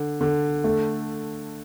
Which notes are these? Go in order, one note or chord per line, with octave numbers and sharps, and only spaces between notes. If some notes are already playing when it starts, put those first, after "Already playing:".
Already playing: D3
D3
A3